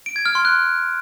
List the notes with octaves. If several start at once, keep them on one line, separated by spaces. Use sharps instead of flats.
D7
G#6
F6
C6
F#6